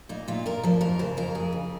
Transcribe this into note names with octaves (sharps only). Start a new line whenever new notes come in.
A#2 D#4
A#2 F4
A#2 A#4
F3 C5
F2 A#4
C#3 C5
F2 A#4
F2 G#4
C#3